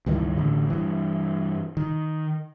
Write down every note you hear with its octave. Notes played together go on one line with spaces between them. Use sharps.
C#2 G2 D#3 E3
A1 D3
G2 E3
D#3